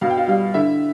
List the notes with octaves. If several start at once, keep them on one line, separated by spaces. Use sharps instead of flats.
B2 F5
G5
F4 F5
G3 F4 F5
D3 E4 E5